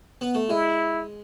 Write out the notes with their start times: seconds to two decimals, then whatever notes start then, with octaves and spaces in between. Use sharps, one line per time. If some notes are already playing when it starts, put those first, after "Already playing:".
0.21 B3
0.35 A3
0.49 G#3 E4